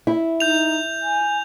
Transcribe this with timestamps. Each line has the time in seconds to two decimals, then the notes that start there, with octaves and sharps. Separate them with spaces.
0.07 E4
0.40 D#4 G6 F7
1.02 G#5